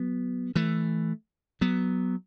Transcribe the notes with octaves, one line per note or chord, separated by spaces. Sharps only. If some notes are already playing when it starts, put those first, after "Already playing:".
Already playing: F#3 B3
E3 A3
F#3 B3